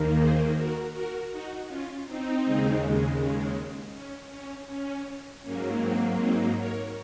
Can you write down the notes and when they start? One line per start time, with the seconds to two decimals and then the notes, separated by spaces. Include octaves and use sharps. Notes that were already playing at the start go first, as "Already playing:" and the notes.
Already playing: D#2 D#3 A#3
0.19 G#4 C5
0.56 F#4 A#4
0.94 F#4 A#4
1.31 D#4 F#4
1.68 C#4 F4
2.06 C4 D#4
2.44 D#2 C#3 G#3
3.93 C#4
4.31 C#4
4.68 C#4
5.43 G#2 F#3 A#3 C#4
5.81 C4
6.18 C4 D#4
6.56 A#4 C#5